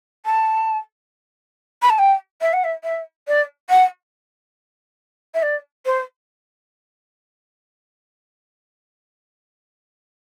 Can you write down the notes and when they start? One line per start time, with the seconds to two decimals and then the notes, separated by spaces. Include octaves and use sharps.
0.25 A5
1.82 B5
1.89 A5
1.98 G5
2.41 E5
2.53 F#5
2.64 E5
2.84 E5
3.27 D5
3.69 F#5
5.34 E5
5.42 D5
5.85 C5